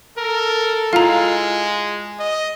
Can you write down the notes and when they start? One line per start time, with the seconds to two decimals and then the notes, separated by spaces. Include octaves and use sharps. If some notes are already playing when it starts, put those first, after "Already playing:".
0.18 A4 A#4
0.93 G#3 E4 F4 F5 A#5
2.20 D#5